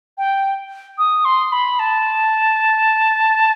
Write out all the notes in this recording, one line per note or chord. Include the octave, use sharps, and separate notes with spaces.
G5
D#6
C6
B5
A5